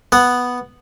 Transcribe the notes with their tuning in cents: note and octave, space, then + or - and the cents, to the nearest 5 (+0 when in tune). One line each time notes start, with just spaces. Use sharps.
B3 +0 F#5 +0